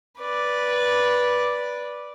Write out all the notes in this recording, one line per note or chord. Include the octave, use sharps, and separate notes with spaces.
B4 D5